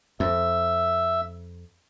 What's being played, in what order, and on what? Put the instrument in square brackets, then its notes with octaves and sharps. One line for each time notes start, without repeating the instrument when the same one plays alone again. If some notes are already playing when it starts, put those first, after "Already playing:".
[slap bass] F2 [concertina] E5